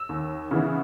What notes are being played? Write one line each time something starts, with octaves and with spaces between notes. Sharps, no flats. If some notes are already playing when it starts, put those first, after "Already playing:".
Already playing: E6
D#2
C#3 E3 B3